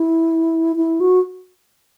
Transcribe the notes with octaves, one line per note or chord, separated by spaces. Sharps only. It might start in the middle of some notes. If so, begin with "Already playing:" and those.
Already playing: E4
E4
F#4